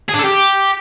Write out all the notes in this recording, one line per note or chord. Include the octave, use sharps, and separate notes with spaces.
G#4
D4
A4
G4